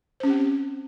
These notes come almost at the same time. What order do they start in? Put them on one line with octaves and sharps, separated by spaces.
C5 C#4 G4 C4